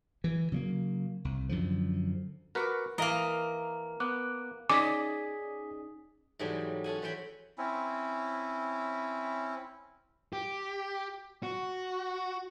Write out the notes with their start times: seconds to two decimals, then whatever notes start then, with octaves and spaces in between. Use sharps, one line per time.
0.24 E3
0.52 C#3 F#3 G3 A#3
1.25 C2
1.49 F#2 D3 F3
2.55 F#4 A#4 B4 C#6 D6
2.98 E3 A#3 A#4 D#5 F5
4.00 B3 D6 F#6
4.70 C#4 D#4 G#4 D5 D#5 G#5 D6 B6
6.39 G#2 C3 E3 F#3 G3 A3
6.84 C#4 A4 F#5 G#5
7.02 E3 C5 C#5 G5 B5
7.58 C4 C#4 E4
10.33 G4
11.43 F#4